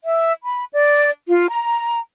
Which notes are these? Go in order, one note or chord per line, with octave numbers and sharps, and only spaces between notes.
E5
B5
D5
F4
A#5